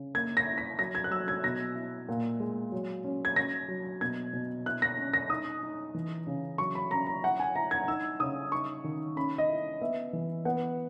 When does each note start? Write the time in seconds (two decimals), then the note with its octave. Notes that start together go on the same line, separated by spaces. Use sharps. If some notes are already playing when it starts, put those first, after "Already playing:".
Already playing: C#3
0.15 A#3 G#6
0.37 A#6
0.46 E4
0.58 B6
0.79 F#3 A#6
0.95 G#6
1.04 F#6
1.11 F#3 E6
1.28 G#6
1.44 B2 A#6
1.75 E4
2.09 A#2
2.40 G#3
2.72 F#3
3.04 C#4
3.25 G#6
3.36 C#4 A#6
3.68 F#3
4.01 B2 G#6
4.33 B2
4.66 E4 F#6
4.82 A#6
4.99 C#4
5.14 A#6
5.30 D#4 D#6
5.63 D#4
5.94 E3
6.27 C#3
6.58 F#3 C#6
6.75 B5
6.91 C#4 A#5
7.07 A#5
7.23 E4 F#5
7.40 G#5
7.55 E4 A#5
7.71 G#6
7.88 D#4 E6
8.20 C#3 D#6
8.52 D#4 C#6
8.84 D#3
9.16 C#4 B5
9.38 D#5
9.49 E4
9.81 B3 E5
10.13 E3
10.45 B3 F#5